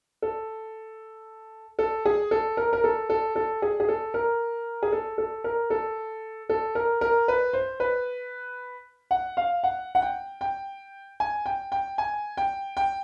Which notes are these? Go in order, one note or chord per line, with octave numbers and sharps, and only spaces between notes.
A4
A4
G#4
A4
A#4
A#4
A4
A4
A4
G#4
G#4
A4
A#4
G#4
A4
A4
A#4
A4
A4
A#4
A#4
B4
C5
B4
F#5
F5
F#5
F#5
G5
G5
G#5
G5
G5
G#5
G5
G5